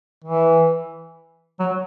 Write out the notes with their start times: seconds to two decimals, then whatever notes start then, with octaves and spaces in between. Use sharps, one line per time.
0.24 E3
1.60 F#3